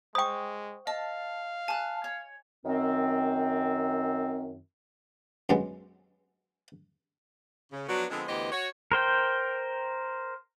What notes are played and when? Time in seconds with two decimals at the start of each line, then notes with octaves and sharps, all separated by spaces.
0.15 G#3 C5 G5 C#6 D#6
0.87 D#5 F5 A5
1.68 G#5 A5 F#6
2.04 C#5
2.64 F#2 D#3 C4
5.49 F#2 G#3 B3
7.72 C#3
7.88 F3 F#3 B3 D4 F#4
8.10 D3 F3 G#3 B3 C4
8.27 D2 E3 B3 G4 C5 D#5
8.51 F#4 C#5
8.92 A#4 C5 G5